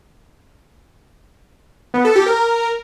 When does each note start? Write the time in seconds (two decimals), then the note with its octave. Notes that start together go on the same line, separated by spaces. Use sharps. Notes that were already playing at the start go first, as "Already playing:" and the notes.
1.94 B3
2.05 A4
2.15 G4
2.26 A#4